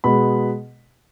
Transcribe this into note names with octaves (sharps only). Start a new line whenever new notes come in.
B2 G#3 B3 B5